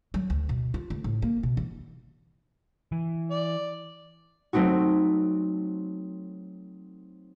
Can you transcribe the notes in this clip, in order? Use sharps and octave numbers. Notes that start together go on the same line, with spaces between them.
F#3
D2
B2
F4
D2
A2
A#3
B2
E3
E3
D5
F#3 A3 C4 D#4 F#4